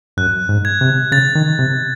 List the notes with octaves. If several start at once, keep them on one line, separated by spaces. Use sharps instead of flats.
F#2 F#6
G#2
G#6
C3
C#3 A6
D#3
C3